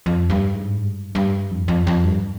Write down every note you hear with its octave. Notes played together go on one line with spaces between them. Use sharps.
F2
G2
G#2
G2
G2
F2
F2
F2
G2